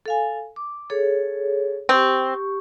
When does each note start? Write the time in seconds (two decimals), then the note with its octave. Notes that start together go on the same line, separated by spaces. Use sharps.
0.06 A4 F5 G#5
0.56 D6
0.90 G#4 A4 C#5
1.89 C4 G4 C#6